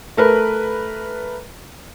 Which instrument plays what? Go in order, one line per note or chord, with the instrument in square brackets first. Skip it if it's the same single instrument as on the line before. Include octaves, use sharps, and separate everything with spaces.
[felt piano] A3 A#4 B4